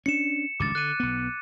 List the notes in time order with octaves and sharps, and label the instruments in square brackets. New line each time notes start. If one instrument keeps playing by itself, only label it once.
[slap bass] C#4 D4 [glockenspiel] C#7 E7
[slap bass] G#1 C#2 G2 [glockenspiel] D6 A6
[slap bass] D3 [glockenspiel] F#6 D#7
[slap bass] B1 B3